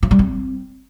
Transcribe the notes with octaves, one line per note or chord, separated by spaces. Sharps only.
F3
G3
C4